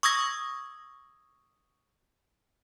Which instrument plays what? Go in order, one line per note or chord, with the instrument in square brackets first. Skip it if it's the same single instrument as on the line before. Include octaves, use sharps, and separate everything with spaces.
[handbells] C#6 D#6 E6 G#6 A#6